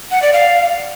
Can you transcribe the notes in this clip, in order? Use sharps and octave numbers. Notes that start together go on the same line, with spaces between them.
F#5
D5
F5